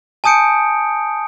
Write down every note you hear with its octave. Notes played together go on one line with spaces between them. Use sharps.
G#5 A5 D#6 G6 C#7 D7